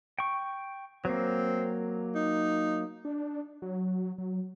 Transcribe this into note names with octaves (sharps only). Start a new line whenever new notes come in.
G5 C#6
F#3 A#3 C4
D#4
D4
F#3
F#3